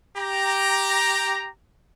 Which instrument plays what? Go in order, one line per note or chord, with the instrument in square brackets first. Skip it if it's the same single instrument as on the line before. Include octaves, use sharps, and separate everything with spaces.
[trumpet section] G4 A#5